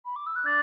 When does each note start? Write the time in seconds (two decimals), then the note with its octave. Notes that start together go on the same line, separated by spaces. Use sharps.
0.05 B5
0.16 D6
0.26 E6
0.35 F#6
0.46 D4 A6